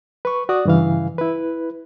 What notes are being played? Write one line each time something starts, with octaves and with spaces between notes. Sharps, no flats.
B4 C#6
F#4 D5 D#6
G2 C#3 E3 F5
E4 B4